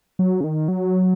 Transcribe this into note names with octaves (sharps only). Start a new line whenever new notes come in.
F#3
C#3
D#3
F#3